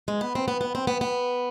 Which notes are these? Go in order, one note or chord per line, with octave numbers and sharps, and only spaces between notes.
G#3
B3
C4
B3
B3
C4
B3
B3